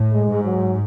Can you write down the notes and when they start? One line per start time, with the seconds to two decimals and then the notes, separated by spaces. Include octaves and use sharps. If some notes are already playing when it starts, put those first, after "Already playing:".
Already playing: A2
0.13 G#3
0.29 G#2
0.44 F#3